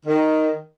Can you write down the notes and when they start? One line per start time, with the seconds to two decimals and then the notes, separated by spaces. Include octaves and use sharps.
0.06 D#3